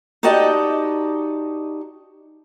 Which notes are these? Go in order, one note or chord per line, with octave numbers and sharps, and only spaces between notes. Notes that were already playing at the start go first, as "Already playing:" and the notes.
D#4 F#4 G4 D5 D#5 A5